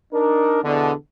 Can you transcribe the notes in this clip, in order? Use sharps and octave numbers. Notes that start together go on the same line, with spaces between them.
D4 D#4 A#4
E2 B2 D3